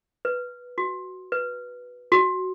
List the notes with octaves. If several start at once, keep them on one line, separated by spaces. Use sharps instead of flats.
B4
F#4
B4
F#4